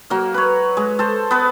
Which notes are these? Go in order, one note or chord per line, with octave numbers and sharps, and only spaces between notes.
F#3 A#3
B4 C#5
G#3
A4 C5
B3 B4